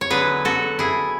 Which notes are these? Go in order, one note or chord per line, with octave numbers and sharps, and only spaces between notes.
C#5
D3 F#3 B3 G#4 B4
F#4 A4
E4 G#4